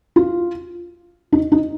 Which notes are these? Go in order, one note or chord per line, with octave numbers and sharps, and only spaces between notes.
F4
D#4
D#4